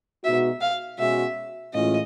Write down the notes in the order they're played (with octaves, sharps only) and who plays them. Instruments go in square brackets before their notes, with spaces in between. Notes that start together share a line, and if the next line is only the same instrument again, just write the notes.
[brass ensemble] B2 G#3 B3 D#4 F#4 [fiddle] E5
[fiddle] F5
[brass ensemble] B2 G#3 C#4 F#4 [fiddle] E5
[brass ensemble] A2 E3 G#3 C#4 F4 [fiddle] D#5